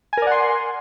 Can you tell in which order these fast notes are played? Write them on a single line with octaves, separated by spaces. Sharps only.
G#5 A#4 D5 F#5 C6